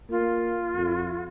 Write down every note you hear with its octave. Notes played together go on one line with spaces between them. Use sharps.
A#3 F4
F2